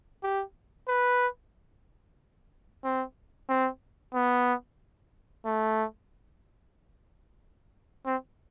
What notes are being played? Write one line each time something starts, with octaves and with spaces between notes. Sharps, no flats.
G4
B4
C4
C4
B3
A3
C4